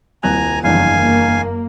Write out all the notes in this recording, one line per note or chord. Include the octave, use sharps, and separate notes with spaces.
D#1 C2 G#5 A#5 F#6
F#1 E2 G2 C3 D#3 F3 F5 G#5
F#2 A#3